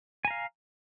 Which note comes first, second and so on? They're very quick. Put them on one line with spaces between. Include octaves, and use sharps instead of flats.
G#5 A#5 F5